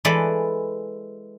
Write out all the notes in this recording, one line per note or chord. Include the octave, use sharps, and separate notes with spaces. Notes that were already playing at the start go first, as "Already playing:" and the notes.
E3 G#3 A4 B4 D5